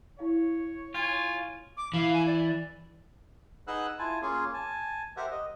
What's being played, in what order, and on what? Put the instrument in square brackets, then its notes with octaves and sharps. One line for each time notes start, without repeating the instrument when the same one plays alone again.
[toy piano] E4 F5 [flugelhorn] C#5
[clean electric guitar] F4 [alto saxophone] G#5
[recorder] D6
[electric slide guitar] E3 [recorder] F5
[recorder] G#5
D5
[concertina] D#4 G#4 B4 F#5 E6 F#6
E4 F4 G#5 A5
A#3 C#4 F4 G#4
G#5 A5
G4 A#4 C5 E5 F#5
D#5